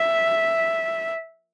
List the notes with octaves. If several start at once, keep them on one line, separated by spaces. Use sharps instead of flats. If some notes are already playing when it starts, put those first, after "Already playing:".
Already playing: E5